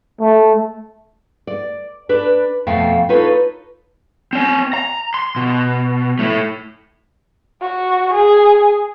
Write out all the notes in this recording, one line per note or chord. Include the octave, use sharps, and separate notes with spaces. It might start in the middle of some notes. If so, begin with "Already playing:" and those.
A3
D5
D4 B4 D5
F2 B2 A3 F5 G5
D#4 F4 A4 B4 C#5
C4 C#5
A#5
C6
B2
A3 E4
F#4
G#4